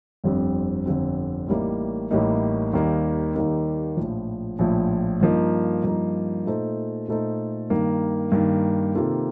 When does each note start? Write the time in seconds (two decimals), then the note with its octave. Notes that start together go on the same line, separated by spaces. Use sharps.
0.24 G1 F2 D3 G3 C4
0.86 G1 F2 D3 G3 C4
1.48 A1 A2 G3 A#3 D#4
2.11 A1 A2 G3 A#3 D#4
2.73 D#2 D#3 G3 A#3 D#4
3.35 D#2 D#3 G3 A#3 D#4
3.97 A#1 A2 F3
4.59 A#1 A2 F3
5.21 G2 F3 A#3 D#4
5.84 G2 F3 A#3 D#4
6.46 A#2 A3 D#4 A4 C5
7.08 A#2 A3 D#4 A4 C5
7.70 G2 D#3 A#3
8.32 G2 D#3 A#3
8.95 C3 D#3 A#3 F4 A4